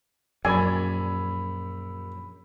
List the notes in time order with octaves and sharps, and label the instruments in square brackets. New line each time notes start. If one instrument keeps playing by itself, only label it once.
[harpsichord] A#1 [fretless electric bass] F#2 [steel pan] D5 G#5 [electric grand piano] B5 E6